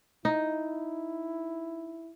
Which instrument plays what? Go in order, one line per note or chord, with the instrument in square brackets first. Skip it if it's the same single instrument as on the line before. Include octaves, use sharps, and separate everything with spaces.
[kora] D#4 [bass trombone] E4